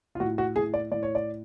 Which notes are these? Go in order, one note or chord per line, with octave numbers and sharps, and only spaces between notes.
F4
A2 F#4
F#4
A2 G#4
D5
A2 D5
C#5
D5